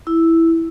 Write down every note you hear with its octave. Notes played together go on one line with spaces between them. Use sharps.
E4